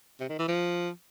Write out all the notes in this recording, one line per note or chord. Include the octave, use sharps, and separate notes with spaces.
C3
D#3
E3
F3